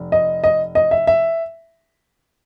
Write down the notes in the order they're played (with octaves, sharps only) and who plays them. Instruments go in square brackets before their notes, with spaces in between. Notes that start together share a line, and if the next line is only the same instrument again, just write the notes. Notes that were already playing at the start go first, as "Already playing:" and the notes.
Already playing: [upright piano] F1
D#5
D#5
D#5
E5
E5